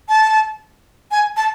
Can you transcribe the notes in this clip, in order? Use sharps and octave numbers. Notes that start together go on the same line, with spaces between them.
A5
G#5
A5